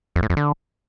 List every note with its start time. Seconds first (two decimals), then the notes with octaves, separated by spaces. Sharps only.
0.16 F2
0.23 A2
0.30 F2
0.37 D3